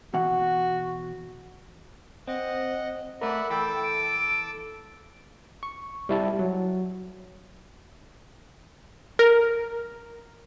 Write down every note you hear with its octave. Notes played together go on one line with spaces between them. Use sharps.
B2 E3 F#4 F#5
C4 D#5 F#5
A3 A#4 D5 E5 F#5 B5
E3 A4 G5 B5 D6 E6
D7
C#6
G3 E4 A5
F#3
A#4